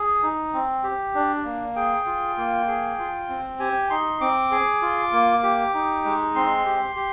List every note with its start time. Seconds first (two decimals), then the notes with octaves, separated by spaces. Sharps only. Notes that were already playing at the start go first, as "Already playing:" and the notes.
Already playing: G#4
0.23 D#4
0.53 C4
0.84 G4
1.15 D4
1.45 A#3
1.76 G#4 G5
2.06 F4
2.37 A#3
2.68 G#4
2.99 F4
3.29 C4
3.60 G4 G#5
3.90 D#4 C6
4.21 C4 D6
4.51 G#4
4.82 F4
5.12 A#3
5.43 G4
5.74 D#4
6.05 G#3
6.35 C4 C6
6.66 G4
6.96 G4